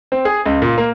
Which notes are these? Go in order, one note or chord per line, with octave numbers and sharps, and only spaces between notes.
C4
G#4
C#2
A#2
A#3